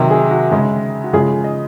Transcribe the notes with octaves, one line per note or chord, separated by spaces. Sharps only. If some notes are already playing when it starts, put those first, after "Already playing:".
Already playing: C3 D#3 F#3
G#4
F#4
C#3 G#3
F#4
C#3 F3 G#3 G#4
D#5